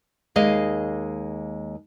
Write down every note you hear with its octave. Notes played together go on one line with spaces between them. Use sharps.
D#2 G#3 D#5 F5